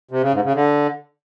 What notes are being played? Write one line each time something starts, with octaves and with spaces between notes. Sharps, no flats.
C3
C#3
G#2
C#3
D3